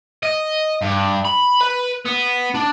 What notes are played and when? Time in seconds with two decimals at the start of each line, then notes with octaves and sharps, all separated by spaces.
0.23 D#5
0.82 G2
1.25 B5
1.61 B4
2.06 B3
2.55 D4